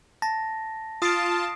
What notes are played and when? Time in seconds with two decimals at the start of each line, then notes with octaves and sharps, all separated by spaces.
0.22 A5 A#6
1.02 F4 A5 D#6 C7 D7